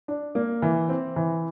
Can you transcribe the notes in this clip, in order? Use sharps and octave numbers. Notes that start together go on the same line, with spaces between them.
D4
A#3
E3
C4
E3